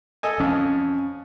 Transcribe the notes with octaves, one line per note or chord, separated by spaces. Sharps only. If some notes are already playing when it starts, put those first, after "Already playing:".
A4 D#5 G#5
F2 C#4